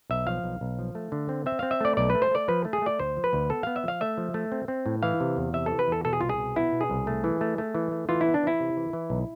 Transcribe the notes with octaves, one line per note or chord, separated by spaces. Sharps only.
B1 E5
F3 F5
B1
B1
F3
A3
D3
C4
C4 E5
C4 F5
E5
A3 D5
B1 D5
A3 B4
C5
A3 D5
F3 B4
A3
G#4
A3 D5
D2 C5
F3
B4
D2
B3 A4
B3 F5
E5
F3 F5
A3 E5
F3
A3
C4
C4
A2
E3 F5
C3
E2
C3 E5
A4
E3
B4
E2 A4
B2 A4
G#4
C2 F4
G#4
B2
B3 E4
B2
G#4
C2
A3
E3
A3
A3
E3
A3
E3 F4
E4
B3
D4
E3 E4
C3
E3
E3
B1